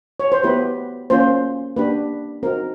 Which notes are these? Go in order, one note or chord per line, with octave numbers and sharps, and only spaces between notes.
C#5
C5
B3 E4 G4 B4
A#3 C#4 F4 C5
A#3 D4 G4 B4
C4 D#4 F#4 A#4